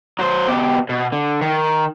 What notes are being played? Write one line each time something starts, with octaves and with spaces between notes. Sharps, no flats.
F#3 C5
B2 G4
B2
D3
D#3